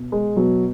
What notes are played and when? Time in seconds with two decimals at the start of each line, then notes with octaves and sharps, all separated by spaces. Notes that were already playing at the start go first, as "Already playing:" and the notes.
Already playing: B2
0.12 G#3
0.36 B2 F#3